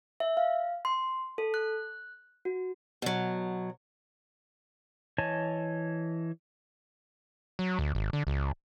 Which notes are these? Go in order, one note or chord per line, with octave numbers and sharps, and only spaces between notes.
E5
F5
C6
A4
F#6
F#4
B2 F#3
E3 C#5 D#5 G#5 A5
F#3
D2
G#1
D3
C#2